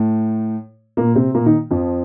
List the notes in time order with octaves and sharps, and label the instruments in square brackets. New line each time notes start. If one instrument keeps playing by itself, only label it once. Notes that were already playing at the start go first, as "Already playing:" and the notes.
Already playing: [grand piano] A2 A3
A#2 A#3
C3 C4
A#2 A#3
D#3 D#4
F2 F3